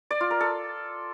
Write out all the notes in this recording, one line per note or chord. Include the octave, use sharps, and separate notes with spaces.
D5
F4
A#4
A4